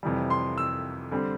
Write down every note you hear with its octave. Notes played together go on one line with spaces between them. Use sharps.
F2 C3 E3 G3
C6
E6
D3 G3 C4